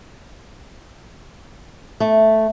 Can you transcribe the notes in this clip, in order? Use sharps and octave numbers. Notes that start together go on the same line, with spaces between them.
A3